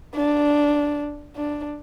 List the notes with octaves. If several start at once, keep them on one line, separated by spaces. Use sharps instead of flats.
D4
D4